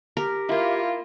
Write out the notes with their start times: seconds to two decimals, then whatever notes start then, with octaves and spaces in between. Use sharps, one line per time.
0.17 G4 A#4
0.49 A#3 E4 F4